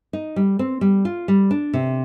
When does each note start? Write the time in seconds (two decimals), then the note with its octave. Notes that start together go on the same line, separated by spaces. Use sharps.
0.13 D#4
0.36 G3
0.59 C4
0.81 G3
1.05 F4
1.28 G3
1.51 D4
1.73 C3